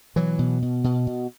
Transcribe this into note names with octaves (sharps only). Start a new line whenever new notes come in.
B2 E3 F#3
B2
B2
B2
B2